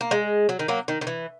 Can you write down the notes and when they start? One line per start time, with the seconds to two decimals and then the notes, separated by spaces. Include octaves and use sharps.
0.01 A#3
0.11 G#3
0.49 F#3
0.59 D#3
0.68 F#3 A#3
0.88 D#3
1.01 D#3
1.07 E3